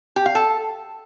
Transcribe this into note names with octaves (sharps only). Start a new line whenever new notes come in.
G4
F5
A4